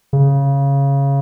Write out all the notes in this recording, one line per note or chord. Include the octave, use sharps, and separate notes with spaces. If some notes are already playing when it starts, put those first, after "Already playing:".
C#3